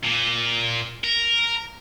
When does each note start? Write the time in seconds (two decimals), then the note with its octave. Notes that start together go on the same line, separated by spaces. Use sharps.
0.05 A#2
1.04 A#4